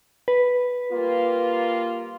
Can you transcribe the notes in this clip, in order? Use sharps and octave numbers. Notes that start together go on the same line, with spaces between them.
B4
G3 A#3 F4